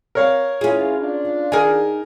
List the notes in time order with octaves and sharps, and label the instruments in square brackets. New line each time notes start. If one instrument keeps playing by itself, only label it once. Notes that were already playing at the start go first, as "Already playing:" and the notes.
[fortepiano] A#4 C#5 F5
[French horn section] E2 E4 F4 [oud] C#4 G#4
[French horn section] D4 F4
[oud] D#3 D#4 G#4 [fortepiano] A#4 G#5